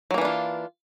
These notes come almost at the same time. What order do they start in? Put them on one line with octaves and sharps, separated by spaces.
F#3 A#3 E3 D4 F4